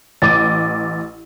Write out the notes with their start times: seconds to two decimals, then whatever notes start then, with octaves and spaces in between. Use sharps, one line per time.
0.22 A1 D6 A6 D#7